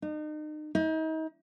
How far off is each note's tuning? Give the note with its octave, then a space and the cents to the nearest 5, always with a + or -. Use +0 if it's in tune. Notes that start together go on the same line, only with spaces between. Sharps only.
D#4 -35
D#4 +35